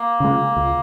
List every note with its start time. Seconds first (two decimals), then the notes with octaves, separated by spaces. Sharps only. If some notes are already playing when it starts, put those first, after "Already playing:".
Already playing: A#3
0.20 C#3 G#3
0.57 C#2